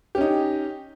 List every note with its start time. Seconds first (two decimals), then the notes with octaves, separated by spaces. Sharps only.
0.15 G4
0.18 C#4
0.21 D#4